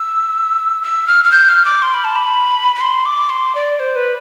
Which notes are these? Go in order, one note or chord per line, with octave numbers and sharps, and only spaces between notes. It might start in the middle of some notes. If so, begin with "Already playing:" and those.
Already playing: E6
E6
F6
F6
G6
F6
D6
C6
B5
A5
B5
B5
C6
D6
C6
D5
C5
B4